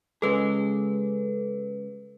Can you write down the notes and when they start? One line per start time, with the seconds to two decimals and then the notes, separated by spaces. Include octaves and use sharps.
0.22 C#3 G#3 G#4 A4 B4